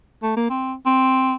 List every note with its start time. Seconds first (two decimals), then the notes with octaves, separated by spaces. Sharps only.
0.22 A3
0.36 A#3
0.50 C4
0.86 C4